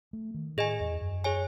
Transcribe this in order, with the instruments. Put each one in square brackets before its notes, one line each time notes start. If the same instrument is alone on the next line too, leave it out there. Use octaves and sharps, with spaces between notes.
[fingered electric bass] A3
D#3
[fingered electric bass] A2 [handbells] G#4 D#5 G#5
[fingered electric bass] E2
F#2
[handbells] G#4 C#5 G#5